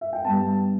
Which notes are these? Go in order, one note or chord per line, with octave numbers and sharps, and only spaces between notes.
E5
G5
G2 G3 B3 A5